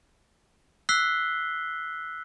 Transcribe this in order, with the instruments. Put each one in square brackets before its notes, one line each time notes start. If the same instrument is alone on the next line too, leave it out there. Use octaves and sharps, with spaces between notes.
[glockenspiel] E6 F#6 B6 C7 G7